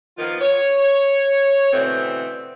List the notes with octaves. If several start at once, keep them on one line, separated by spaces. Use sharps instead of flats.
D#3 F3 A#3 B3 F4
C#5
B2 D3 E3 A3 C4